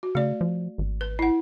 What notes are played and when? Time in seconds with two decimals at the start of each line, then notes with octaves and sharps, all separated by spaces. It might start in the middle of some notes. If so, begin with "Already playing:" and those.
0.03 F#4
0.15 C#3 A3 D5
0.41 F3
0.78 G#1
1.01 B4
1.19 E4 F#5